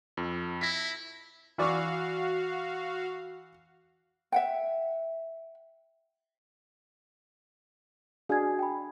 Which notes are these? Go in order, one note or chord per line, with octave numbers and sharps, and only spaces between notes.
F2
E4 A#6 B6
E3 F#4 D5 F5 C#6
E5 F#5 G5
D4 F#4 G#4 F5 G#6
G5 B5